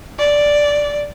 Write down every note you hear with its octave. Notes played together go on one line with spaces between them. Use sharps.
D5